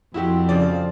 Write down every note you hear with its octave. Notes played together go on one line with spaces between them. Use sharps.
F2 C4 E4 F#4 G4
C#3 F3 D5